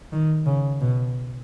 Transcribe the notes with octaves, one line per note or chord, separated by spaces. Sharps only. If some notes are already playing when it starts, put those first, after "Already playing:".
D#3
C#3
B2